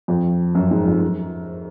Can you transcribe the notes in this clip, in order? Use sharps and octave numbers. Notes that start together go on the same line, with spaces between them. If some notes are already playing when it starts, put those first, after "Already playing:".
F2
F#2
G#2
F2
F#2